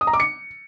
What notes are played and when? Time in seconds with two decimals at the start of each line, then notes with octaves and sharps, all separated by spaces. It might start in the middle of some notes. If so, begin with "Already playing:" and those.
0.01 D#6
0.07 A#5
0.13 D6
0.20 C#7